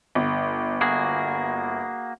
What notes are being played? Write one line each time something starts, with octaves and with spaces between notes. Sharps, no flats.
G1
A#3 F#4 G#4